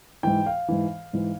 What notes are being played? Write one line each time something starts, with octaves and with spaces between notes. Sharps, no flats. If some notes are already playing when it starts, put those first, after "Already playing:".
G#2 E3 G5
F5
G#2 E3
G#2 E3